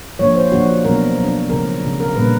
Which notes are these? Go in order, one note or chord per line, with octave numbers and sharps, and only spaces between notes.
F3 A#3 D4 C#5
C5
F3 A#3 D4 F#4
B2 F#3 B3 D4 A#4
B2 F#3 B3 D4
C#3 F3 A3 A#4
C#3 F3 A3
A#4
A#2 G3 A#3 D4 B4